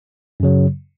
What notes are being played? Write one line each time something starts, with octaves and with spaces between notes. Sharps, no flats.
F#2 C#3 F#3